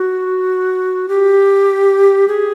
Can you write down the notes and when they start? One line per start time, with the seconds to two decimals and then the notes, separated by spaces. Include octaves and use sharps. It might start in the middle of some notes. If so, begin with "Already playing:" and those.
Already playing: F#4
1.09 G4
2.28 G#4